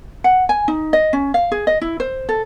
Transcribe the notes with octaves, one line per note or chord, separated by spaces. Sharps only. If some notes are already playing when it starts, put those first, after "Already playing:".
F#5
G#5
D#4
D#5
C#4
F5
G#4
D#5
E4
C5
A4